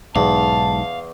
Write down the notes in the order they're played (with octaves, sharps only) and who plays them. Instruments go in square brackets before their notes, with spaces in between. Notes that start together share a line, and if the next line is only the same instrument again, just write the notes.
[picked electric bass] B1 G#2 [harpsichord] E2 [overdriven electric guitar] F5 [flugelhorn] A5